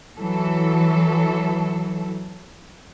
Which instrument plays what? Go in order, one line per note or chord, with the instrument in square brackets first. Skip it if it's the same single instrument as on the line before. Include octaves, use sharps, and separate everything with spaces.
[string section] E3 F#3 A4